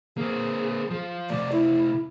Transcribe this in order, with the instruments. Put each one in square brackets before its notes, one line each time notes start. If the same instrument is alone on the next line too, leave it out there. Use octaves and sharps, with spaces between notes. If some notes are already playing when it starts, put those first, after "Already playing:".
[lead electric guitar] A#3 C4 [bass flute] G#4
[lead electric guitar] F3
[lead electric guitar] C3 A3 [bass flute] D5
[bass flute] E4